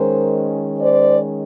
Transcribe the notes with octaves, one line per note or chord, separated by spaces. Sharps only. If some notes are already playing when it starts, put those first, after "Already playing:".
Already playing: D#3 G#3 C#4 A#4 C5
C5 D5